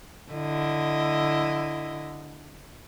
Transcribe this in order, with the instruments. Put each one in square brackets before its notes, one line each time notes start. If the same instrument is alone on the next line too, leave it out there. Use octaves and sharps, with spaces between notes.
[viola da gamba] D3 E4 D#5